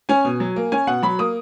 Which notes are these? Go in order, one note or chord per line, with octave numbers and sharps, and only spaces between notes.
C#4 G#5
B2
F#3
A#3
C#4 G#5
B2 F#5
F#3 B5
A#3 D#6